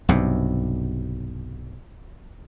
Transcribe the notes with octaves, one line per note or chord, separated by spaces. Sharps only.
B1 G2 C3